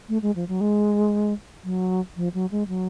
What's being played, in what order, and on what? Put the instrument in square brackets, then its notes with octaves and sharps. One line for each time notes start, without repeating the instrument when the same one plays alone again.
[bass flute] A3
G#3
F3
F#3
G#3
F#3
F3
F#3
G#3
F#3